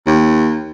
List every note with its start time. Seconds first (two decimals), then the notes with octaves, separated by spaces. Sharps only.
0.07 D#2